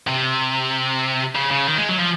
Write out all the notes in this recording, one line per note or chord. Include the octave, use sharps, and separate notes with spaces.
C3
C#3
C#3
D#3
G#3
F#3
F3